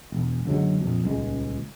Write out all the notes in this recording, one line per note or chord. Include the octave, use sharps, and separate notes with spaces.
E1
F#1 D3 F#3 G#3
A#1 F2
D#1 C#2 G#3